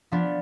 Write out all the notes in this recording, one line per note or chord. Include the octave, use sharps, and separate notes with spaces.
F3 B3 D4